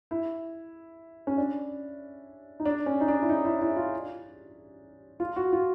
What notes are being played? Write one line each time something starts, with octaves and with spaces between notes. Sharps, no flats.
E4
C#4
D4
D#4
D4
C#4
D#4
D4
E4
D#4
E4
E4
F4
F4
F#4
F4